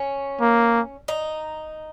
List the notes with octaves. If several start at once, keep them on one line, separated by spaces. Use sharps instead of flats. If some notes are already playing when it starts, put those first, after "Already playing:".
Already playing: C#4
A#3
D#4